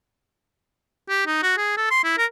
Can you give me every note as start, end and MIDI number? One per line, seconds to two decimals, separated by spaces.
1.09 1.24 67
1.27 1.39 63
1.43 1.57 66
1.57 1.73 68
1.77 1.90 69
1.91 2.02 84
2.04 2.14 64
2.18 2.26 70